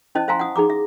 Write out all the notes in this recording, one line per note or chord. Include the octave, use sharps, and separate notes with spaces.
C#4 E4 C5 D#5 A5
C5 E5 F5 G#5 A#5 C6
F#5 D#6
D#4 G#4 A#5 D6
E5